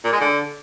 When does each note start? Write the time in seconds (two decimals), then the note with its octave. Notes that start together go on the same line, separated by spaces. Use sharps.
0.04 A#2
0.13 G#3
0.21 D3